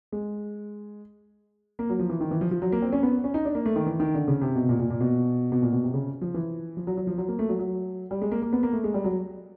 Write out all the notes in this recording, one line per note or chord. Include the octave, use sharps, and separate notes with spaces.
G#3
A#3
F#3
F3
E3
D#3
E3
F3
F3
F#3
A#3
C4
C#4
B3
C#4
D#4
D4
A#3
A3
D#3
E3
D#3
D3
C#3
C3
B2
A#2
A#2
A#2
B2
B2
A#2
B2
C3
C#3
F3
E3
F3
F#3
F#3
F3
F#3
A#3
A3
F#3
F#3
G3
G#3
A#3
A#3
B3
A#3
A3
G#3
G3
F#3